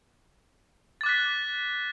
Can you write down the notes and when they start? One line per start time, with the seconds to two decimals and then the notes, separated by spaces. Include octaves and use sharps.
1.01 A6
1.03 D6
1.06 F#6
1.09 B6